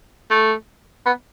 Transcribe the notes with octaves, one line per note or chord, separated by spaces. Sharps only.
A3
B3